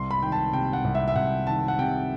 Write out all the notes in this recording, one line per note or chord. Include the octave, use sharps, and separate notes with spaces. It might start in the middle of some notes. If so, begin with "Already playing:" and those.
Already playing: C2 C6
B5
D#3 G5
A5
C3 G5
F#5
C2
E5
E5
C2 F#5
D#3 A5
F#5
C3 G5